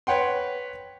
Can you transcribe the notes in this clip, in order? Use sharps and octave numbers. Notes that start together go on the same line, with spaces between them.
B4 C#5 F#5 G5 C6